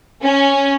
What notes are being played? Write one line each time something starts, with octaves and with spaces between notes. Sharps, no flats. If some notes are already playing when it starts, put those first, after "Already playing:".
C#4